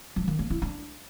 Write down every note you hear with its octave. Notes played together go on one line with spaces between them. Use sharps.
F3
D#3
A#3
E4
D4